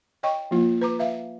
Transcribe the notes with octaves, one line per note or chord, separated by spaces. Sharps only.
C#5 D#5 G5 C#6
F3 A#3 F4
B4 A#5 D6
B4 E5 F5